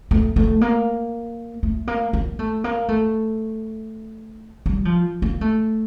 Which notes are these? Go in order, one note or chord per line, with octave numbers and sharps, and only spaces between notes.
A3
A3
A#3
A3
A#3
A#3
A3
A#3
A3
G3
F3
A#3
A3